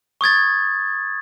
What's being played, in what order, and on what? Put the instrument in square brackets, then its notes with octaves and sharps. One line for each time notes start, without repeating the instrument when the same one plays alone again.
[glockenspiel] C#6 D#6 G#6 A6